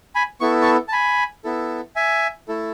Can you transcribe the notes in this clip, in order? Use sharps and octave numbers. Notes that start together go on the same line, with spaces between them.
G#5 B5
B3 E4 A4 C#6
A5 C#6
A5
G#5 B5
B3 E4 A4
E5 G#5
A3 E4 A4